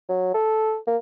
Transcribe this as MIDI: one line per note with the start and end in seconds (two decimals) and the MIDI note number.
0.09 0.32 54
0.34 0.77 69
0.87 0.97 58